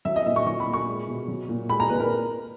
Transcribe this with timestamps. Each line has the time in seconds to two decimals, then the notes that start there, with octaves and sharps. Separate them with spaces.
0.05 F#3 E5
0.16 D#5
0.26 A#2 E5
0.36 C#6
0.46 F#3 C#6
0.60 B5
0.67 A#2
0.73 C#6
0.87 G#3
1.08 B2
1.28 F#3
1.49 A#2
1.69 G#3 B5
1.80 A#5
1.89 A#2 B4
2.00 A#4